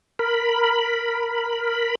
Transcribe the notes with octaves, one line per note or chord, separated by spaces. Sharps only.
A#4 B5